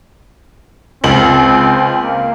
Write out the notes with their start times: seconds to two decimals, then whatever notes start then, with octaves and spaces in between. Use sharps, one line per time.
1.04 C#2 C4 F#7
2.02 A#3